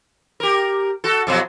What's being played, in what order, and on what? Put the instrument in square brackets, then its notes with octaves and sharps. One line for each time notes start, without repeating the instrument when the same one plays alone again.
[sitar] G4 A#4
F#4 A4
F2 B2 F#3